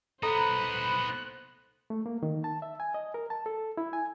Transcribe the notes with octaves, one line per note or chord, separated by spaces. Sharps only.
B3 D#4 A4 C5 A#5 B5 F#6
A3
A#3
D#3
A5
E5
G#5
D#5
A#4
A5
A4
E4
G#5